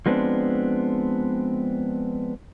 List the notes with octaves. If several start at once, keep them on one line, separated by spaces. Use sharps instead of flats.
F3 G#3 B3 C4 D4